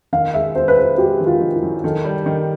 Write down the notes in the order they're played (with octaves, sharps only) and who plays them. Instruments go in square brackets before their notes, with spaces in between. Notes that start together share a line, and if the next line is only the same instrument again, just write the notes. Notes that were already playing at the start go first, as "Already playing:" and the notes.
[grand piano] D#3 [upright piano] F5
[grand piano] G#3 [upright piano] E5
[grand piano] B3 [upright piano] C5
[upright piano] B4
[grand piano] G#3 [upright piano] C5
[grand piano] G#3 [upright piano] G4
[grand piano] D#3
[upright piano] F4
[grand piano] D#3
[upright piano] E4
[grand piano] F#2
[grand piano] D#3 [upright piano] A4
[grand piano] G3
D#3